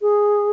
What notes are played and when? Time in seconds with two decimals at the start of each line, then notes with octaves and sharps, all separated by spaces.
0.01 G#4